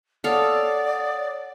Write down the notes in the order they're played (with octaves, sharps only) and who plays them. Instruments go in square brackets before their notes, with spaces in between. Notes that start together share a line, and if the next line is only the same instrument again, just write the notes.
[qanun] A4 F5 [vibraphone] C#5 F#5 D#6 [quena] D5